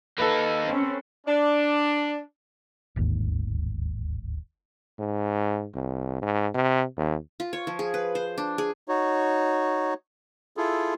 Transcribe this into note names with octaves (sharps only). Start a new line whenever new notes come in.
A#3 D#4 A4 B4
C4 C#4
D4
D1 G#1 D#2 G#2
G#2
C2
G#2
C3
D#2
F4
C#5
F3
G#4
B4
C5
D4
G#4
D#4 F#4 C#5
E4 F4 G#4 A4